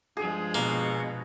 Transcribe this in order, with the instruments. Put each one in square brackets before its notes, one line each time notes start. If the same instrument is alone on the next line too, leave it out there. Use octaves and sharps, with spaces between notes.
[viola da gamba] G2 F3 G#3 [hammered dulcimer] G#4
[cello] B2 [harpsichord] A#3